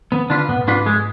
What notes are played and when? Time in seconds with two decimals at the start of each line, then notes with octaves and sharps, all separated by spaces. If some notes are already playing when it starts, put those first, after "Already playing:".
0.12 D#3 B3
0.30 D3 D4 F4 B4
0.49 G#2 B3
0.56 B2
0.64 G#2 D4 F4 B4
0.86 G#3